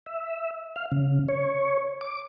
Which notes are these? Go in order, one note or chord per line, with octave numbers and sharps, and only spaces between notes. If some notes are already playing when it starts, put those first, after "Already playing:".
E5
F5
C#3
C#5
D6